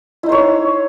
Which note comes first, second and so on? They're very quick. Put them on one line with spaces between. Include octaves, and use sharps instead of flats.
E4 D#4 C5 C#5